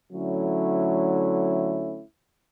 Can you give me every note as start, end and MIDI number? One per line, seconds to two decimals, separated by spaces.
0.12 2.03 50
0.12 2.03 54
0.12 2.03 57
0.12 2.03 61
0.12 2.03 64